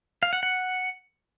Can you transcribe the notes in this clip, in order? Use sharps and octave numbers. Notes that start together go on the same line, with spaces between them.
F5
F#5
F#5